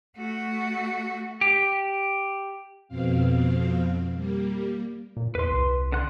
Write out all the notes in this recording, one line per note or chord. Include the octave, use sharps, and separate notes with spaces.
A3 F#4
G4
F2 B2 C4 F5
G3 A#3
A#2
E2 B4 C6
C2
D3 F#5 C6